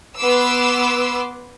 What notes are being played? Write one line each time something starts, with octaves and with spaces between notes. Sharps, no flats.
B3 B4 C6 D6 E6